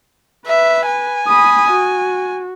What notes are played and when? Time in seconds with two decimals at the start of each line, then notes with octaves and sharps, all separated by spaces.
0.47 B4 E5
0.87 G#5
1.27 B5 D#6
1.71 F#4